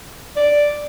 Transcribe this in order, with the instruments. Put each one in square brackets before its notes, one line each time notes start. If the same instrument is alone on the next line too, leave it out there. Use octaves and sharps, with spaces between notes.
[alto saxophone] D5